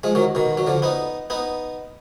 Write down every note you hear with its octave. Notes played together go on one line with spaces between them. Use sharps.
F3 G#3
D#3 F#3
B2 D#3
F#3
D3 F3
B3 D#4
B3 D#4